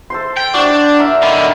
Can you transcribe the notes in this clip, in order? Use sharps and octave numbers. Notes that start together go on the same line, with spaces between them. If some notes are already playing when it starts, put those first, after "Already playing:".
A4 C5 C6
G5
D4 F#4 C5
A#4 E5
D3 D#3 A#4 B5 C6